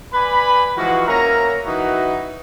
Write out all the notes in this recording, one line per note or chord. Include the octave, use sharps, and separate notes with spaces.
B4 D5 G#5 B5
E3 F3 G#3 F#4
A#3 C#4 A#4 E5 A#5
E3 D#4 E4 F#4